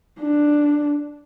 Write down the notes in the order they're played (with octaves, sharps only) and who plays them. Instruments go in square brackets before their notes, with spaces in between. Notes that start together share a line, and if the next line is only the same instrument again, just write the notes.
[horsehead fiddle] D4